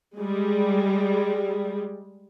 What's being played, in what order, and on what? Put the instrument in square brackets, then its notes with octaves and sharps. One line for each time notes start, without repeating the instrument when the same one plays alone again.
[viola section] G3 G#3